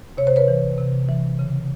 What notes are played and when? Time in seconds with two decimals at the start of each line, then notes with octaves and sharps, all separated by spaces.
0.18 C3 C#5
0.27 C5
0.36 B4 C#5
0.48 E3
0.78 C3
1.09 E3
1.39 C#3